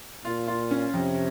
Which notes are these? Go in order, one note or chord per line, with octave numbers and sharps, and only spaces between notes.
A#2 F4
F4
C#4
F2 C3